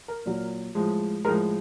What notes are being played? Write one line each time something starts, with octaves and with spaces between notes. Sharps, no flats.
A#4
A#2 F#3
A2 F3 G#3
A2 F3 G#3 A#4